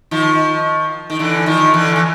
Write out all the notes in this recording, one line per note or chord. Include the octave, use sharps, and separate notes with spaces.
D#3 F3
D#3
D3 E3
D#3 F3
D3 E3
E3